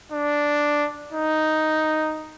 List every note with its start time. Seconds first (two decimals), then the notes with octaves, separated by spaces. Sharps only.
0.12 D4
1.13 D#4